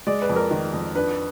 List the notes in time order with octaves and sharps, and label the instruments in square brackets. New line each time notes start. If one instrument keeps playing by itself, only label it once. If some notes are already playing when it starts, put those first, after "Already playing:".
[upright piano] G#3 D5
B4
F2
A#4
D#3
F2
D4 B4